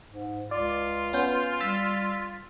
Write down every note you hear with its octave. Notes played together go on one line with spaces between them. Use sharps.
G#2
C#2 F4 D5
B3 C#4 G6
G3 E6 A6 B6